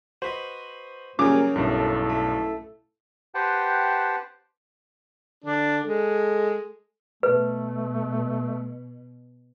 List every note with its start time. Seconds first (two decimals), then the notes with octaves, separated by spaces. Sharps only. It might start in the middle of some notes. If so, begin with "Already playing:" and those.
0.22 F#4 B4 C5 D#5
1.19 C#3 F#3 G3 A#3 A#4 G#5 D6
1.56 B1 G2 E4 A4
2.09 A3
3.35 G4 B4 C5 F#5 G5 A5
5.44 D3 D4
5.85 G#3 A4
7.23 B2 A3 B4